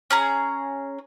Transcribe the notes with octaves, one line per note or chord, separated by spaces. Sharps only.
C#4 G#4 A#5